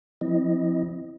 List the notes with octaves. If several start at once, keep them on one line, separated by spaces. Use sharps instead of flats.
F3 C4 E4 D#5